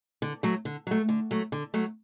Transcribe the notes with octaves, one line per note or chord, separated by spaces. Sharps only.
D3
F#3 A3
D3
F#3 A3
D3
F#3 A3
D3
F#3 A3